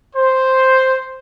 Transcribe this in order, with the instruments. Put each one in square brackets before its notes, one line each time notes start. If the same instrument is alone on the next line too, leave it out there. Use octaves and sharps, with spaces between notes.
[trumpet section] C5